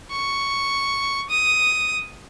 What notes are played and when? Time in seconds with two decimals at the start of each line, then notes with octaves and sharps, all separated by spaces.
0.11 C#6
1.30 D#6